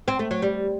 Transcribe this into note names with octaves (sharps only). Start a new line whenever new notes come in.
C4
A3
F#3
G3